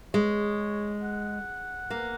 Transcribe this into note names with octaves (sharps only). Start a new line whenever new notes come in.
G#3 C#5
F#5
A#3